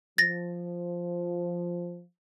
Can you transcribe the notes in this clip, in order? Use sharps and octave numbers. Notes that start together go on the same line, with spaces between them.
F3 A6 A#6